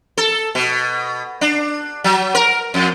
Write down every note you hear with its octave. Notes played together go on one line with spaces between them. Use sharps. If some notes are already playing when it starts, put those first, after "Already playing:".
A4
B2
D4
F#3
A#4
F2